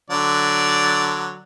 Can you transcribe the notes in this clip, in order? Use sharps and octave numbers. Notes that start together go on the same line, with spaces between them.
D3 F#3 D5